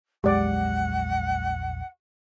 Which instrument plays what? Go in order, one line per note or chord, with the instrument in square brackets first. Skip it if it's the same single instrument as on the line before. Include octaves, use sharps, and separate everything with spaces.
[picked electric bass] A#1 E2 F#3 [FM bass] G#3 [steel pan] G4 D5 D6 [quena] F#5